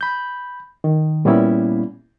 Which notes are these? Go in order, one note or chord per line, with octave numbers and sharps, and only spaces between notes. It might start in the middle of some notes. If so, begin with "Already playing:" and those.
B5 G6
D#3
A#2 G3 A#3 B3 C#4 E4